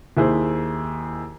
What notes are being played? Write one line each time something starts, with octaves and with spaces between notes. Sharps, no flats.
D#2 E4 G#4 C5